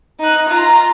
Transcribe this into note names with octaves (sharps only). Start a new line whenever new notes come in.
D#4 F#6
F4 A#5